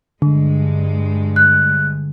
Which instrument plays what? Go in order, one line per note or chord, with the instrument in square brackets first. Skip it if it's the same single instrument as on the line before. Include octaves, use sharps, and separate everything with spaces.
[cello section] G2 G#3 [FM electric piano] D3
[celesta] F#6